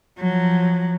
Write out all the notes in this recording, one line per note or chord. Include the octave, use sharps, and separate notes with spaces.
F3 F#3